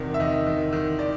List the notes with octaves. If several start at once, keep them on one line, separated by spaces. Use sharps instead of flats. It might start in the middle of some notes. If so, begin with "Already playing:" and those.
Already playing: E2 C3 D#3 D5
E5
D#3 D#5
D#3
D#3
D5